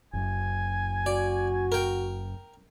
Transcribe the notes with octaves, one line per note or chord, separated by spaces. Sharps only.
F#1 F#2 G#5
F#4 D5
A#4 G5